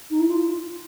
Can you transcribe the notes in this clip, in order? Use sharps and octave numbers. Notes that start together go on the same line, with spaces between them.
D#4
E4
F4